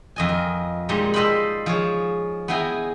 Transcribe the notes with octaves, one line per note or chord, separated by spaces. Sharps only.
F2 D#5 G#5
A#4
A#2 G3 G#3 D#4 A#5
A4 C5 D#5 F5 G5 B5
F3 G#4 C#5
B3 E4 G#4 G5 G#5 A#5